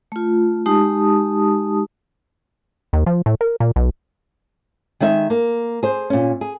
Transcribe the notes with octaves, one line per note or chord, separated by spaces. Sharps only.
A3 F4
G#3 D#4 G4 A5 D#6
D#2
F3
A2
A#4
A#2
B1
D#3 G#3 D#4 E5
A#3
G#4 C5
A#2 C#4
G#4